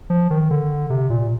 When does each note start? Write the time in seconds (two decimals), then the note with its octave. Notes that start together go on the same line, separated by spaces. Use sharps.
0.10 F3
0.30 D#3
0.51 D3
0.90 C3
1.10 A#2